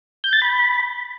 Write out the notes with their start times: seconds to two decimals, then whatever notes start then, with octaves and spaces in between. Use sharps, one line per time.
0.24 G6
0.33 A6
0.42 B5